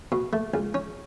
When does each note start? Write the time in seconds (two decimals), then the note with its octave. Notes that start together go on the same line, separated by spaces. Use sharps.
0.12 B2
0.33 A3
0.54 C#2
0.74 C#4